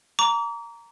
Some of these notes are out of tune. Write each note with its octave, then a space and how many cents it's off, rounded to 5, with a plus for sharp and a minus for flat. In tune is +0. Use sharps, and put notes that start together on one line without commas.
A#5 +0 D6 -40